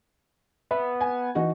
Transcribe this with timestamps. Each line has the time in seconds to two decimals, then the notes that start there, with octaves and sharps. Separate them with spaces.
0.71 B3 E5
1.01 G#5
1.35 E3 D#4 F#4